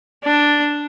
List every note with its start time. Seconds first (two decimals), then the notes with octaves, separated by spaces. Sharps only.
0.24 D4